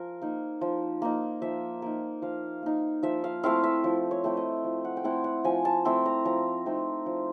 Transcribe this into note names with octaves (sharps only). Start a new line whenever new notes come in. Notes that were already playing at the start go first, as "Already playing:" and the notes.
Already playing: F3 A#4
A#3 D#4
F3
A#3 D#4
F3 E5
A#3 D#4
F3 F5
A#3 D#4
F3 E5
F5
A3 C4 E4 F5
E5
F3
C#5
A3 C4 E4
D#5
F3
F#5
G5
A3 C4 E4 F#5
F#5
F3 G#5
A5
A3 C4 E4
A#5
F3 A#5
A3 C4 D#4
F3